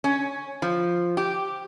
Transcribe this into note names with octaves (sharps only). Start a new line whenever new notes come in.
C#4
F3
G4